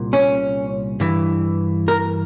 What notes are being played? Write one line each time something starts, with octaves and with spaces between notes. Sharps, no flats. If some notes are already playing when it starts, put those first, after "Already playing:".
Already playing: C2 A#2
C#4
G2 E3
A#4